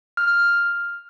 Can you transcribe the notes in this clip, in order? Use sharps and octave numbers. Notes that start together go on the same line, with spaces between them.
F6